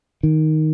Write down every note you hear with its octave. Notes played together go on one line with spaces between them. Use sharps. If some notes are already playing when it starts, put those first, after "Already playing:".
D#3